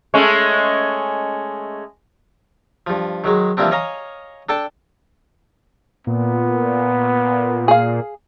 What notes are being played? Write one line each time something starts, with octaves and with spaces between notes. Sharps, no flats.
G#3 A3 C#4
G2 F3
D#3 F#3 G#3
E3 F3 G3 A#3 C4 D4
C#5 D#5 F5 G#5 A#5
D4 A4 G5 A5
A#2 B3
G#4 F5